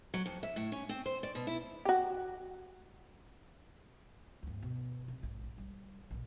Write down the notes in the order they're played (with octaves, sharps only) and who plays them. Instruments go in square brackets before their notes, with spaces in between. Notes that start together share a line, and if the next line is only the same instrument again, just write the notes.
[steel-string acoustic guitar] F#3
F2
E5
A2
C#4
C4
C5
D5
B2
E4
[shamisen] F#4 G4
[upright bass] G1 D2
B2
C3
A#1 G#2
G3
A#1 A#2